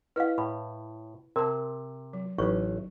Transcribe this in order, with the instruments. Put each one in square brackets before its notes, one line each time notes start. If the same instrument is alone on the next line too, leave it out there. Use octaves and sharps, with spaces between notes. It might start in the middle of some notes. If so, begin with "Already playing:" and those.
[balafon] E4 D#5 [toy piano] B4 F5
[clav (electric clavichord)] A2 [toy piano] B5
[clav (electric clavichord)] C3 [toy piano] A#4 [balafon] C5 A5
[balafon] F#3
[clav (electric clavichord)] A1 [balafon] F#3 D#4 [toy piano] C#6